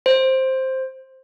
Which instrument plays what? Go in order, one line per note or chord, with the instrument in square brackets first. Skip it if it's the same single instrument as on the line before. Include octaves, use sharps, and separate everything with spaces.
[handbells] C5